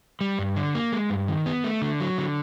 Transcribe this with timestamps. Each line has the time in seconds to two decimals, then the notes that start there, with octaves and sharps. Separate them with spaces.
0.21 G3
0.39 G2
0.56 D3
0.75 A#3
0.92 G#3
1.10 G2
1.28 D#3
1.46 B3
1.64 A3
1.82 D3
2.00 F#3
2.18 D3